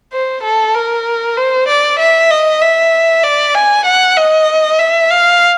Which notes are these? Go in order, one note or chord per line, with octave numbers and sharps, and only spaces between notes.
C5
A4
A#4
C5
D5
E5
D#5
E5
D5
G#5
F#5
D#5
E5
F5